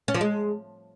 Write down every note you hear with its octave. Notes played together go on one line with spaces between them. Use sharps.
C#4
F3
G#3